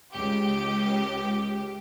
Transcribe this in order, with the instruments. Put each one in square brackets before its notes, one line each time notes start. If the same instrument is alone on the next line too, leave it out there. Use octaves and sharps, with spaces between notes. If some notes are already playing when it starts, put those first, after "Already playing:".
[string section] C#2 G4